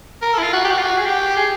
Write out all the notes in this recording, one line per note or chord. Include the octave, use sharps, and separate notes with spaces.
A#4
A4
E4
F4
F#4
G4
F#4
F4
F#4
G#4
G4
G#4